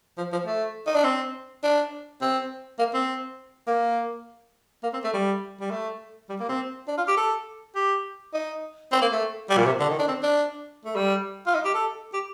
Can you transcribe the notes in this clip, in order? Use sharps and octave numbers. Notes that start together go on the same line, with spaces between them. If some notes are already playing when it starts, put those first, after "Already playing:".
F3
F3
A3
D#4
D4
C4
D4
C4
A#3
C4
A#3
A#3
C4
A3
G3
G3
A3
G3
A#3
C4
D4
F4
G4
A4
G4
D#4
C4
A#3
A3
G3
A#2
C3
D3
D#3
D4
C4
D4
A3
G3
F4
D#4
G4
A4
G4